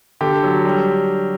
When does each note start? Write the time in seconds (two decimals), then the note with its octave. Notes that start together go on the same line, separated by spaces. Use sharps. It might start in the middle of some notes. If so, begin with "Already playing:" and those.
0.21 D3 G4
0.44 F#3
0.65 G3